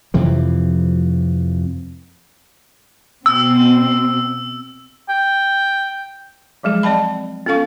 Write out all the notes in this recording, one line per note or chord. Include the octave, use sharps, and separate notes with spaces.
F2 C3 E3 F3
B2 C4 E6
G5
F3 F#3 G#3 G#4
C4 D5 D#5 G5 A5 B5
B3 C#4 A4 F5 C#6